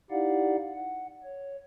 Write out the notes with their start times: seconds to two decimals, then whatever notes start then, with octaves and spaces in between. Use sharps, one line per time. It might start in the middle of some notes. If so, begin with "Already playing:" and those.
0.10 D#4 E4 G4 D5 F5 F#5
0.74 F#5
1.23 C#5